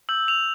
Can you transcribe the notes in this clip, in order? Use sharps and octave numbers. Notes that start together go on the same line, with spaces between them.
E6 G6 F#7
F7